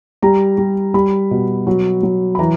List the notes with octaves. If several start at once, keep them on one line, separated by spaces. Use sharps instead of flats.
G3 A#5
G3
G3 B5
B2
F#3
F#3
B5
E3 A#5